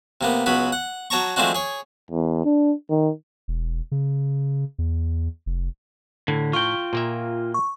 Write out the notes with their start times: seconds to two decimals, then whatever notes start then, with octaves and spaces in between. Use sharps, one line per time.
0.21 C3 A#3 B3
0.46 C#2 F#3 B3 B5
0.72 F#5
1.10 F#3 C#5 A5 A#5 C#6
1.36 F3 G#3 A3 C4 D4 F#4
1.55 G#4 C#5
2.11 E2
2.45 D4
2.90 D#3
3.48 E1
3.92 C#3
4.78 E2
5.46 F1
6.28 A2 D3
6.53 F4 G5 C#6
6.93 A#2 A#3 E5
7.54 C#6